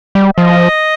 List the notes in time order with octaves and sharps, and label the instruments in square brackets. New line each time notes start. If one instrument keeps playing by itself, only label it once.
[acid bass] G3
[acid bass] F3 [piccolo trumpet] D#5